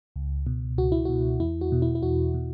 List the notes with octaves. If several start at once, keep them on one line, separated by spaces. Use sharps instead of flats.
C#2
B2
C#2 F#4
E4
B2 F#4
E2 E4
F#4
B2
E4
E4
E2 F#4
B2